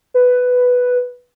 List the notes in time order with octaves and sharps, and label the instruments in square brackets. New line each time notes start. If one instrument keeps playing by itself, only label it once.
[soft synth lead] B4